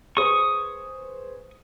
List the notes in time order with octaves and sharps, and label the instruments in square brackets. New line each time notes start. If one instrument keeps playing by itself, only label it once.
[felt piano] G#4 B4 C5 [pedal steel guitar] C#6 D#6